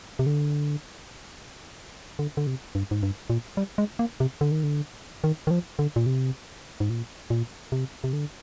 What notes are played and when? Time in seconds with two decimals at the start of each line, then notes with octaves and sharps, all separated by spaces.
0.19 C3
0.26 D3
2.19 D3
2.37 D3
2.47 C3
2.75 G2
2.91 G#2
3.03 G2
3.30 A#2
3.57 G3
3.78 G#3
3.99 A#3
4.20 C3
4.41 D3
4.52 D#3
4.63 D3
5.24 D#3
5.47 D#3
5.51 F3
5.79 D3
5.96 A#2
6.06 C3
6.80 G#2
6.90 A#2
7.30 A#2
7.72 C3
8.04 C3
8.13 D3